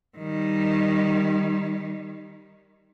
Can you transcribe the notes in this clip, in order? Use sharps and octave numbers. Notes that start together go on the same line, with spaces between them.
D#3 G3